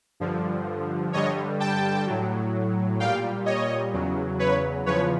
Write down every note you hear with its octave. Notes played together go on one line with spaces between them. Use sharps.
G2 D3 F3
G2 D3 G3 C#5 D#5
G5 A5
A2 F#3
A#2 G3 F5 G5
C#5 D#5
E2 C#3 F#3
B4 C#5
E2 C#3 F3 B4 C#5